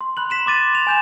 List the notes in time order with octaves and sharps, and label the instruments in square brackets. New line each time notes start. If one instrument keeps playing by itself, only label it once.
[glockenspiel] C6
B5 F#6 F#7
B6 E7 F#7
C6 D6 A6 D#7
F7
G#5 G6 E7